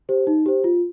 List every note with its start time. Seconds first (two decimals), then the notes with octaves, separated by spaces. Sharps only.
0.09 G4 C5
0.27 D#4
0.46 G4 C5
0.64 F4